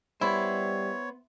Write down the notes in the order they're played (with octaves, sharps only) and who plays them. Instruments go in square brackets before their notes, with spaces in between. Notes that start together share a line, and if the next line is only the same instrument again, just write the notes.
[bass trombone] G3 [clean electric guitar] B3 C5 [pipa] E4 [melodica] C#5